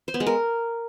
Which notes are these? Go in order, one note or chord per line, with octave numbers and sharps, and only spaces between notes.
C5
B3
G#3
A#4